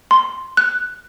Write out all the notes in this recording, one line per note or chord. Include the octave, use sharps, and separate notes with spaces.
C6
F#6